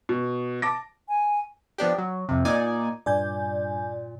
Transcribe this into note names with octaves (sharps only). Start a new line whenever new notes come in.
B2
A5 D6 A#6
G#5
F3 B3 D4 G4
F#3
F2 C3
A#2 D#4 D5 G#5
G2 A#2 D5 G#5 G6